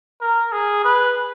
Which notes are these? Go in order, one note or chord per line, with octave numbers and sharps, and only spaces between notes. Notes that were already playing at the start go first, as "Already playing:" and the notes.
A#4
G#4
B4